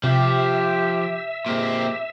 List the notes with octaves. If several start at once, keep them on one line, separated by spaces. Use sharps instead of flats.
C3 F3 G4 E5
A#2 G#3 C4 G4 A#4